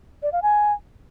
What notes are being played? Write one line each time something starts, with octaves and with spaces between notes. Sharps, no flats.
D5
F5
G#5